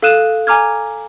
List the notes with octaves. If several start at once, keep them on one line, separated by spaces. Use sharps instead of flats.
A4 F5 D#6 F#6 D#7 E7
G#5 A#5 D6 F6 G#6